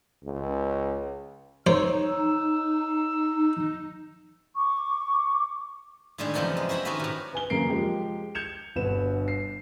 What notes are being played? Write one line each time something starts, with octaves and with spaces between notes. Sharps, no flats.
C#2
D#4 C5 C#5 E6
C#6 D6
A2 D3 D#3 G3 G#3
F#2 C3 E3 F3 A#4 G5
G#3
E4 F#4 C5 E5 A#5 B5
D#3 C4 C#4 F#4 A#4 B4
A2 C3
B4 G#5 G7
F#2 C#3 A#3 A#5 C7 D7
F3 G#3 G4
G6 G#6 C#7 E7 F7
G1 B2 D3 B4 E7
C7